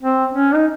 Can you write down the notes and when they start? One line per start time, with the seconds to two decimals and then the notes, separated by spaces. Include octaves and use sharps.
0.03 C4
0.35 C#4
0.55 D#4